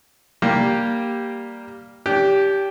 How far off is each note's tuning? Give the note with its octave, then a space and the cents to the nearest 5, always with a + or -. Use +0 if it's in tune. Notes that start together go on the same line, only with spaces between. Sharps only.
G3 +0 A#3 +0 G4 +0
D4 -40 G4 +0